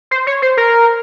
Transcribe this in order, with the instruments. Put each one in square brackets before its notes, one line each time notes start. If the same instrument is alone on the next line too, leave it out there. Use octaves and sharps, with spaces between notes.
[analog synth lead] C5
C#5
C5
A#4